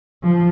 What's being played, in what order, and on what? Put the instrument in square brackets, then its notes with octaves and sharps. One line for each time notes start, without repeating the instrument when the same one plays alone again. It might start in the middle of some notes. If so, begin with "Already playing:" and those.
[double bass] F3